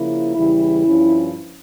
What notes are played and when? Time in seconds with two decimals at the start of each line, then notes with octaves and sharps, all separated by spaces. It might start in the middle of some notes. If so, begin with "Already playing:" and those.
Already playing: C#3 F3 A#3 E4
0.35 E2 C#3 E3 G3 E4
0.85 G2 F3 C#4